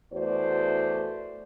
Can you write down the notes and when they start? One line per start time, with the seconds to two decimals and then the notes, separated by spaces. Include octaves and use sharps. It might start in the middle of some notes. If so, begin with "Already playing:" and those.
0.13 E2 A3 F#4 C5 D5